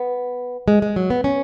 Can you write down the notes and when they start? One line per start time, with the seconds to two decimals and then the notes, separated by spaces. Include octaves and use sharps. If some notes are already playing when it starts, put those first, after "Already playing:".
Already playing: B3
0.68 G#3
0.82 G#3
0.96 F#3
1.10 B3
1.24 C#4